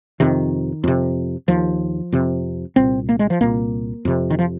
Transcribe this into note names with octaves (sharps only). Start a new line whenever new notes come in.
F2 C3 D#3
F2 C3
D#2 F3
F2 C3
C2 A#2 C4
A#3
G#3
F3
C2 A#2 A#3
F2 C3
D#3
F3